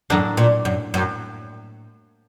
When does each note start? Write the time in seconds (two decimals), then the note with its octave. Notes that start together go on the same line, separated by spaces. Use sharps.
0.10 F#2 A2 F#3 A#3 D4
0.37 A#2
0.65 F#2
0.94 F#2